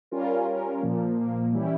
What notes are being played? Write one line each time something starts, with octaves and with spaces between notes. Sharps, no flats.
G3 C#4 F4 A#4
G3 C#4 F4 A#4
A#2 F3 A#3
A#2 F3 A#3
E3 G3 C#4 E4 G4